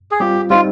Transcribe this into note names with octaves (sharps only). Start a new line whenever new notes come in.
G#4
G3 C4 F4 G4
G3 C4 D#4 F4